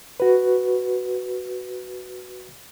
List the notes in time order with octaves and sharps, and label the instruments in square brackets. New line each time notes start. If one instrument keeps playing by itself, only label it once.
[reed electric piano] F#4 B4